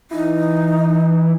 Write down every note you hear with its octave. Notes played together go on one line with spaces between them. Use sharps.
E3 D#4